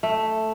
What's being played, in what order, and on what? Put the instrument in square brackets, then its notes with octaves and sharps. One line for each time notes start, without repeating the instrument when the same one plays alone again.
[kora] A3